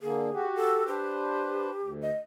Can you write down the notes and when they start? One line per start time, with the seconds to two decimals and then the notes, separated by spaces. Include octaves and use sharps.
0.01 D3 A#3 G#4
0.34 F#4 G4
0.56 A4
0.87 D4 G4 B4 C5
1.82 D2
2.02 D#5